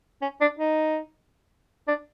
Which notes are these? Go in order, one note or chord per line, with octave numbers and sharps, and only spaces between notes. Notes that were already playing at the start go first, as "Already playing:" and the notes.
C#4
D4
D#4
D4